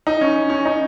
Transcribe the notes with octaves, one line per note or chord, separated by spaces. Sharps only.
D#4
C#4
C#4
D#4